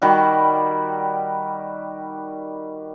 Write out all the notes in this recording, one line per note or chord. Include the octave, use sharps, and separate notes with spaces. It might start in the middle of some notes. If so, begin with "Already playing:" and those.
D#3 G3 F#4